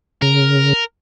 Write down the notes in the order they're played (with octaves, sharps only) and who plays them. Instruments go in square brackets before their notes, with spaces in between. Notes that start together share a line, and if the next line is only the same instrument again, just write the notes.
[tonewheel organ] C#3 [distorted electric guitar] A#4